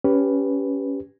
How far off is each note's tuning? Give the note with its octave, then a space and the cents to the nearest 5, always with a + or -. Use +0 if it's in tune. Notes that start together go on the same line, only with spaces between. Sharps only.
C#4 +10 G4 -5 B4 +0